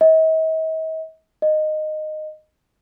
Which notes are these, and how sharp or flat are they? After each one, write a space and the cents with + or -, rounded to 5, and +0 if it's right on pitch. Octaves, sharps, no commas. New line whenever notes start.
D#5 +45
D#5 -10